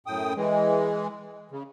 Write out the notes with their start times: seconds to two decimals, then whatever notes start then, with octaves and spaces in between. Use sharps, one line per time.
0.07 F#2 A2 G5 D#6
0.36 E3 G#3
1.51 C#3